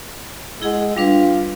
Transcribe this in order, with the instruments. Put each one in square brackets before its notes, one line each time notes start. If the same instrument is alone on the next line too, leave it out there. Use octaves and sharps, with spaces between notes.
[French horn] G#3 [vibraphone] E4 G#4 F#5
[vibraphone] G3 D4 B4 [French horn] F4